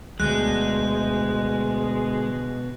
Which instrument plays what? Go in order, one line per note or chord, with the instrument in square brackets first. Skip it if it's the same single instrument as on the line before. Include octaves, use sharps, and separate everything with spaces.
[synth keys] D2 G6 [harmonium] B2 [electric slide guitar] G#3 [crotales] F#6